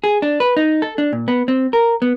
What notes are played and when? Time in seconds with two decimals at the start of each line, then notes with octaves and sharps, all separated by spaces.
0.04 G#4
0.22 D4
0.40 B4
0.57 D#4
0.82 A4
0.98 D4
1.13 A#2
1.28 B3
1.48 C4
1.73 A#4
2.02 B3